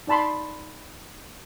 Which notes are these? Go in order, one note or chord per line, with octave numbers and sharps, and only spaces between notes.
D#4 D5 A5 B5 C6